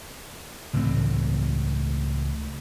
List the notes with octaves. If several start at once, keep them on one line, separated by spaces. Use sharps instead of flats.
C#2 A2 E3 C4